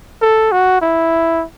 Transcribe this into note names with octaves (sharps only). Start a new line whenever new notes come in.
A4
F#4
E4